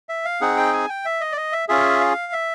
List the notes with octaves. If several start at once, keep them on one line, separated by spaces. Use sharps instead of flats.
E5
F5
C4 D#4 G#4 F#5
G5
G#5
G5
E5
D#5
D5
D#5
E5
C#4 F4 G#4 E5
F5
E5